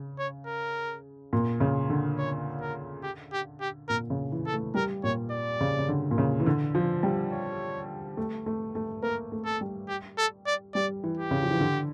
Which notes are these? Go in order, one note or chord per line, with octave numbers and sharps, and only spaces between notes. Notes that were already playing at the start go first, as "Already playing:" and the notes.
Already playing: C#3
C#5
A#4
A#2
C#3
D3
C#5
A#4
G4
G4
G4
A#2 A#4
C#3
E3
A4
A3
G3 A#4
A#2 C#5
D5
C#3
C#3
D3
A#2
C#3
E3
D3
F3
G3
C#5
A3
A3
A3
A#3 A#4
A3
A4
G3
G4
A4
D5
G3 D5
E3
G4
C#3
F3
E3
D3